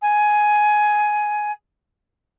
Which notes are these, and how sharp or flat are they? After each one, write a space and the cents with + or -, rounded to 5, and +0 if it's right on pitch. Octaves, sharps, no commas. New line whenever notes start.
G#5 +10